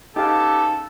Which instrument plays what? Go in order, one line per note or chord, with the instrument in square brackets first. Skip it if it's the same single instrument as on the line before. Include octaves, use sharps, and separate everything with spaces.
[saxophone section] C#3 B3 G4 [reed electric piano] D#4 F5 [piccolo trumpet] A4